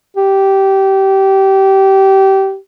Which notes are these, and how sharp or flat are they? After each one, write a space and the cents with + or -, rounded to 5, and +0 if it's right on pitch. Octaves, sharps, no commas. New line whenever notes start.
G4 -20